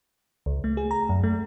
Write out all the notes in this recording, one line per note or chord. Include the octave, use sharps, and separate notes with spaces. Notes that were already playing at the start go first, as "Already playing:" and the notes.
C#2
A3
G#4
A#5
F#2
A3